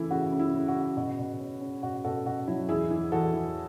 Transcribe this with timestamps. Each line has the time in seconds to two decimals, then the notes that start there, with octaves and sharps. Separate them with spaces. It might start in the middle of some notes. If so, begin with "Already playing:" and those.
Already playing: C#3 E3 A3 E4 A4
0.11 C#3 F#4
0.32 C#3
0.39 E4
0.54 C#3
0.68 F#4
0.75 C#3
0.97 B2 F#4
1.19 B2
1.40 C#4
1.61 C#4
1.83 B2 F#4
2.04 B2 F#4 A4
2.26 B2 F#4
2.47 F#3 E4
2.69 E2 E4 G#4
2.90 E3
3.12 E2 F#4 A4
3.33 E3